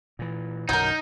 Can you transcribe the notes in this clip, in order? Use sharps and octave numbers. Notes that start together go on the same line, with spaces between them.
A#2 E3
B1 F#2 D3 F#3 D#4 A#4 G6